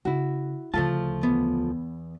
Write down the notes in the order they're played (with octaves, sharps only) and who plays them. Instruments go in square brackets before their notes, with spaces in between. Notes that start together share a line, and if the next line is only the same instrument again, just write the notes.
[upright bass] C#3 [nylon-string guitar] E4 F#4
[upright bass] D2 C#3 [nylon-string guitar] F3 A3 F4 [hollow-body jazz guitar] A5
[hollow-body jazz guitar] E2 B3